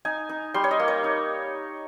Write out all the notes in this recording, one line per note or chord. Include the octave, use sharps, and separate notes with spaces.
D#4 G#5
D#4
G3 C6
C#5
D#5
A#3
C#5
D#4